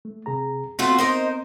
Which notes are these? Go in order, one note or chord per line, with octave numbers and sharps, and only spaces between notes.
A3
C3 G#4 A#5
A3 B3 C4 F4 F#4
D#4 A#4 C5